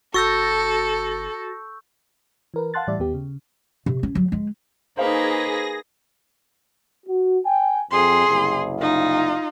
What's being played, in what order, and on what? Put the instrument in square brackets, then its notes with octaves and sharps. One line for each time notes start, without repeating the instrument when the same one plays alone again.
[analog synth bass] F#1 [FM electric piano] F#4 A6 A#6 [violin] A4 [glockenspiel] C#6 E6 G6
[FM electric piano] E3 A#4 B4
F5 F#5 A5 C6 F#6 A6
A2 E3 G3 D5 E5
D#2 B3 G4
C#3
[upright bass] C3
C#4
F#3
G#3
[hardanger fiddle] A#3 B4 [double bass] D#4 [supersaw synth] G#4 A#6 [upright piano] C5 F5
[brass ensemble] F#4
G5 G#5
[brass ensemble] F2 [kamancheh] G#4 C6
[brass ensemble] F#1 C2
[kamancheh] D#4 F4